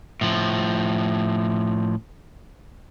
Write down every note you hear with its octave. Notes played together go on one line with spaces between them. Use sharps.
A2 F3